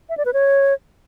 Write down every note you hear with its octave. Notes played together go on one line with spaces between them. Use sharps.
E5
D5
B4
C#5